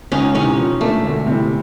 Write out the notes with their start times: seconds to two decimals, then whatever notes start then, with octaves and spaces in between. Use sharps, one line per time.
0.12 C#2 C#4 D#4
0.35 C3 E3 C#4 D#4
0.58 F3
0.81 A3 A#3 D4
1.05 D2
1.26 C3 E3 G3